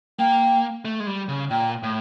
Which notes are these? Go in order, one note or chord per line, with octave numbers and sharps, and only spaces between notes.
A#3 G5
A3
G#3
G3
C#3
A#2 G5
A2